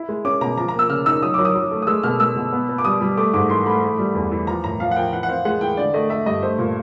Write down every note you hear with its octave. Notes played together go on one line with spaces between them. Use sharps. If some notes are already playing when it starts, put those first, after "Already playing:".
Already playing: E4
G#3
C#4 D6
B2 A#5
F3 A#5
A#5
A#3
E6
C#3 F6
D#4 E6
F#3 D#6
F#3 D6
D#6
F#3
A3
D#6
G#3 E6
B2 F6
G#3 E6
B2
B3
B3
D6
G3 D#6
G3
A3 D6
G#2 D6
E3 C6
A3 B5
E3
G3
E2
E3
F3 A#5
A2 A#5
F3 F5
F#5
F3 G5
E3 F#5
F#5
C4 F5
G#3 F#5
E3 G5
D3 D5
A3 D#5
A3 E5
G2 D#5
A3 C5
A#2